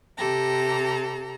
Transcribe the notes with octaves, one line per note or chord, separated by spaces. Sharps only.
C3 G4 A4 A#5